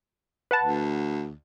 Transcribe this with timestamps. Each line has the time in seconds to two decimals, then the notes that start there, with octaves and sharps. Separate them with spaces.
0.51 B4 F#5 A5
0.62 D2